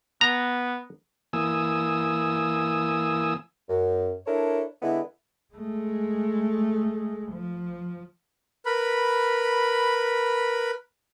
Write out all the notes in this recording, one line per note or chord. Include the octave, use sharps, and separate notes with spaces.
B3 A#5
E3 A#3 G#5 D#6 E6
F#2
D4 E4 A4 A#4 C#5
D3 G#3 B3 E4
G#3 A3
F3
A#4 B4 B5